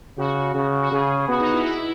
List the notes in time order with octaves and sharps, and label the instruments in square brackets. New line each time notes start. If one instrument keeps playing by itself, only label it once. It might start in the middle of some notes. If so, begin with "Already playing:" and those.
[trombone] C#3 [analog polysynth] F#4
[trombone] C#3
[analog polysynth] F#4
[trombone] C#3 [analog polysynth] G#4
[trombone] B3 [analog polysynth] F#4
[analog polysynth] D#4
E4
E4